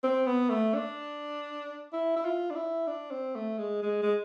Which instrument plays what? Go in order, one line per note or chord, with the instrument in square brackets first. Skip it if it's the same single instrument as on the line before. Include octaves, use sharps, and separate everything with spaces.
[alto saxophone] C4
B3
A3
D4
E4
E4
F4
D4
E4
D4
C4
A3
G#3
G#3
G#3